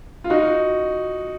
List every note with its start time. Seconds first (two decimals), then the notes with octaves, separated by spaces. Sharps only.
0.24 F4
0.30 D#4 F#4